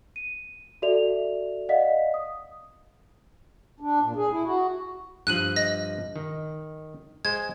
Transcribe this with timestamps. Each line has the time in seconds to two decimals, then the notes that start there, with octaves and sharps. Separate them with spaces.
0.16 D#7
0.82 F#4 A4 D5 E5 F7
1.69 D5 D#5 F5 F#5 B6
2.14 D#6
3.80 D4
4.02 A#2
4.16 G#4
4.31 E4
4.45 F#4
5.27 G2 F3 F#6 D#7 F#7
5.56 D#5 A#6
6.16 D#3
7.25 G#3 C5 G#6